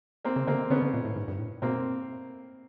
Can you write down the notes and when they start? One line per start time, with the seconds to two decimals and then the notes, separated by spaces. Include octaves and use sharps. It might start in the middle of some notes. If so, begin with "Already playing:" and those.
0.24 A#3 C4
0.36 C#3
0.47 D3 A#3 C4
0.70 D3 B3 C#4
0.82 D3
0.94 A#2
1.05 A2
1.16 G#2
1.28 G2
1.39 A2
1.62 B2 A#3 C4